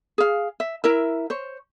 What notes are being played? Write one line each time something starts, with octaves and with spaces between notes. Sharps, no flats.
G#4 F5
E5
E4 A#4 E5
C5 C#5